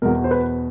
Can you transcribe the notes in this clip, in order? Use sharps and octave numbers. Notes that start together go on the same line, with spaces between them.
E2 B2 A#4
C5
B4